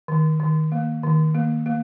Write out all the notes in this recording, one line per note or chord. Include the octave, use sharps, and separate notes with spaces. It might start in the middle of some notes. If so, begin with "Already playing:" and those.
D#3
D#3
A#3
D#3
A#3
A#3